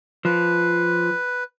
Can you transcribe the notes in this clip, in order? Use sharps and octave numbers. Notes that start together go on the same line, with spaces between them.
F3 B4